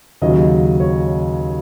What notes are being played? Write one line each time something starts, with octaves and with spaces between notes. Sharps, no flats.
D#2 C#3 F#3 D#5
C#5